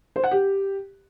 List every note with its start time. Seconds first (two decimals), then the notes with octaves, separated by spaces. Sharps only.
0.16 C5
0.24 F#5
0.31 G4